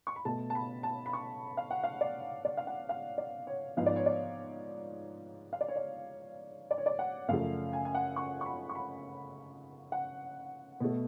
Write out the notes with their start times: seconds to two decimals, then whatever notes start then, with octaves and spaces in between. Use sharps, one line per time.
0.07 C#6
0.16 B5
0.25 B2 A3 A5
0.50 A5
0.55 B5
0.83 A5
1.06 B5
1.13 C#6
1.57 F5
1.71 F#5
1.84 F5
2.01 D5
2.45 D5
2.57 F5
2.67 F#5
2.89 F5
3.18 D5
3.47 C#5
3.77 G#2 F3 B3 F5
3.86 D5
3.96 C#5
4.06 D5
5.53 F5
5.61 D5
5.68 C#5
5.76 D5
6.71 D5
6.78 C#5
6.86 D5
6.99 F#5
7.28 F#2 C#3 F3 A3 F5
7.73 G#5
7.85 G#5
7.95 F#5
8.16 C#6
8.41 C#6
8.46 B5
8.69 C#6
8.75 B5
9.92 F#5
10.80 B2 A3